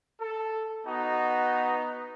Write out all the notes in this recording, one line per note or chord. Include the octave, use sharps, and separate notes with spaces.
A4
B3 D#4 F#4